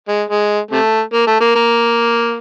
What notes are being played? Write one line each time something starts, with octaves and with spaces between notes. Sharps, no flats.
G#3
G#3
C3 A3
A#3
A3
A#3
A#3